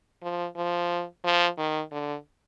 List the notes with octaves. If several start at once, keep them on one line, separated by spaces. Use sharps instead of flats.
F3
F3
F3
D#3
D3